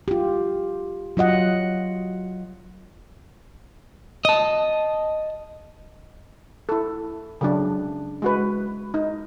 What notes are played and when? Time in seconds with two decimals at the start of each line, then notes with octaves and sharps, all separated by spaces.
0.08 F4 G4
1.17 F#3 F4 D#5 F#5
4.25 D#5 A5
6.69 E4 A4
7.41 C#3 F#3 D4
8.22 G#3 F#4 B4
8.94 D#4